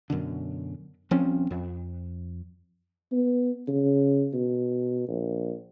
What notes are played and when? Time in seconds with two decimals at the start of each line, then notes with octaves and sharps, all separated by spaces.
0.10 F#2 B2 D3
1.11 D#1 F3 C4 C#4
1.51 F2
3.12 B3
3.67 C#3
4.34 B2
5.08 A#1